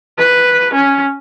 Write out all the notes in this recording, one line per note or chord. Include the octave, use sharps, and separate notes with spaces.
B4
C#4